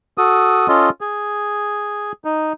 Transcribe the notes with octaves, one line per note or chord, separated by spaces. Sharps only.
F#4 A4 D#6
C#4 F4 A4 D#5
G#4
D#4